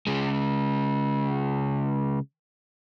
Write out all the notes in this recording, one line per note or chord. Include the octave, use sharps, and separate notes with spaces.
C#3 G#3